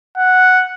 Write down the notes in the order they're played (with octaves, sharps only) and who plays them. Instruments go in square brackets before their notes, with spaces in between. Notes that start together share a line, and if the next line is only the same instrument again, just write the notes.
[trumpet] F#5